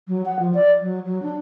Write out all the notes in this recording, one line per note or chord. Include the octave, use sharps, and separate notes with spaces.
F#3
F#5
F3
D5
F#3
F#3
D4